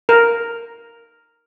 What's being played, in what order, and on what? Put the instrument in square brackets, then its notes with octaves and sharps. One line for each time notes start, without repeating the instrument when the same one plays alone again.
[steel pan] A#4